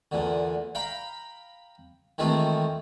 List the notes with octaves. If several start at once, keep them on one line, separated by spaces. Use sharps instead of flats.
E2 A#2 D3
F5 G5 A#5 B5
D#3 E3 G#3 A3 C4 F4